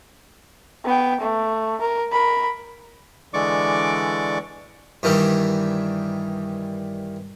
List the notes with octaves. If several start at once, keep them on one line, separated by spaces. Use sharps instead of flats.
B3 G5
A3
A#4
A#4 B5
D3 E3 G#3 D5 C#6 D6
G2 D#3 E3 G3